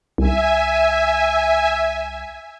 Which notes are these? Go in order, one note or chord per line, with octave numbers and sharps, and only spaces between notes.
C2 E5 G#5